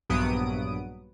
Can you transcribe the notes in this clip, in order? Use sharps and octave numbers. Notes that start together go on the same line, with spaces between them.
A#1 G2 F#3 B3 D#6 D7